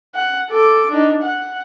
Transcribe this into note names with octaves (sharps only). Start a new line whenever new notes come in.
F#5
A4 D6
D4 D#4
F#5